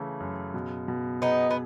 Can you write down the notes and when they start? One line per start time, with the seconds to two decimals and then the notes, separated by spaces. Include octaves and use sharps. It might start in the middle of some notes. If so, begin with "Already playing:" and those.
Already playing: C#3 E3 A3
0.20 F#2
0.54 B2
0.88 B2
1.21 B3 D#4 G#4
1.51 B3